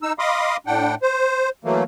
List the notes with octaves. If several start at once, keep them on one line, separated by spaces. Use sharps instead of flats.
D#4 E6
D#5 F5 B5 C6 D6 D#6
A2 D4 F#5 G5
C5
E3 F#3 A3 A#3